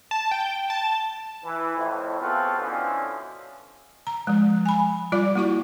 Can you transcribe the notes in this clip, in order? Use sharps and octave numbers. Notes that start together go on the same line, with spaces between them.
A5
G5
A5
E3
F2 A2
B3 C4 F4 F#4 G#4 A4
B2 D3 E3 F3 C#4
A#5
F3 G#3
G#5 B5
G3 F4 D5 D6
A#3 E4 F#4 C#6